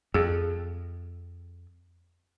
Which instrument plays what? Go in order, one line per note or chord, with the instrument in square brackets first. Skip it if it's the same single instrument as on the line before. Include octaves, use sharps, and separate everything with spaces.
[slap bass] F2 [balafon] G#4